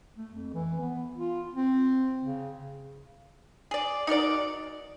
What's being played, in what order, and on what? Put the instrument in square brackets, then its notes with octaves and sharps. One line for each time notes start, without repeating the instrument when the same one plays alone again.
[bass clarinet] A3
F2
E3
B3
F4
C4
C#3
[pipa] G#4 D5
D#4 F#4 A#4 D5